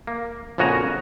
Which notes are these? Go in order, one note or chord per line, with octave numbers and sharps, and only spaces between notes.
A#3
A#1 F2 C#3 F#4 G#5 A#5